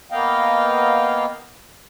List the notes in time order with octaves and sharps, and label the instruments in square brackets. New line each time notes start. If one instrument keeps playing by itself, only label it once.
[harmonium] A#3 B3 D#5 F5 G5